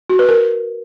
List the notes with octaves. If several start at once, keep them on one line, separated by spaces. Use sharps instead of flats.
F#4
B4
A#4